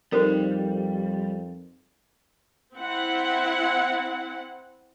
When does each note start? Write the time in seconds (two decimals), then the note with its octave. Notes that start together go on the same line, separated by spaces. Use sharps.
0.12 F2 G3 C4 D#4 A4 A#4 C5
2.76 C4 E4 F#5